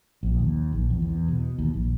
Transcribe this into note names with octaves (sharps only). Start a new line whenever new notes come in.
A#1
D#2
A#1
E2
E2
B2
D#2
A#1